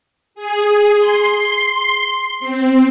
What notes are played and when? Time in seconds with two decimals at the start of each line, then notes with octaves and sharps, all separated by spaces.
0.35 G#4
0.96 C6
2.40 C4